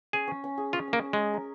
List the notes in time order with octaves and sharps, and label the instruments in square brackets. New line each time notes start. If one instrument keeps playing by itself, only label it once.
[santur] C#4 [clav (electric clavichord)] G#4
[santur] C#4
C#4
G#4
[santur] C#4 [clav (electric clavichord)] F4
[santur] C#4
[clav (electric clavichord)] A#3
[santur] C#4
[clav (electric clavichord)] G#3 [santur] G#4
[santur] A#4